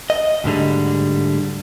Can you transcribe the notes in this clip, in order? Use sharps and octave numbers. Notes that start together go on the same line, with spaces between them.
D#5
D2 G#2 D3 G3